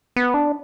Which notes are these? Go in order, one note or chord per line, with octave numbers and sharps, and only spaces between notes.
B3
D4